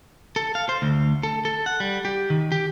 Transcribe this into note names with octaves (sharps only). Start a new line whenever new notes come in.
A4
F5
C5
D2
A4
A4
F#5
G3
G4
D#3
G4